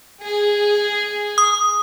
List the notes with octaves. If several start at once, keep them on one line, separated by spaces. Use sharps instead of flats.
G#4
D#6